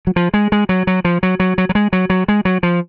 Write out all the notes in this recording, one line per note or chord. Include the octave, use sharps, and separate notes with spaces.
F#3
F3
G#3
G#3
F#3
F#3
F3
F#3
F#3
F#3
F#3
G#3
F#3
F#3
G#3
F#3
F3